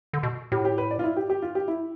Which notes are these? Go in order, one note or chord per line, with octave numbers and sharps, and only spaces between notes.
D3
B2
A2 G4
G4
B4
D5
F4
E4
G4
G4
F4
G4
E4